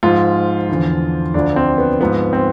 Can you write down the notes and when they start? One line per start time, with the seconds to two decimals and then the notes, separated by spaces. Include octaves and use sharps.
0.03 G#2 F3 F4
0.69 E2 D3 F3
1.34 D2 D3 F3 D4
1.56 C4
1.78 B3
2.00 G#2 F3 B3
2.33 C4